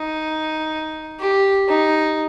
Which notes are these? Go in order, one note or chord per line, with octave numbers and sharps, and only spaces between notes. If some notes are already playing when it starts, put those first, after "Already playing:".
Already playing: D#4
G4
D#4